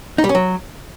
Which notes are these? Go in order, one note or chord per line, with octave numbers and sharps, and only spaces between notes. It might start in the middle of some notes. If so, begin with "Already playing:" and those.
D#4
G3
C#4
F#3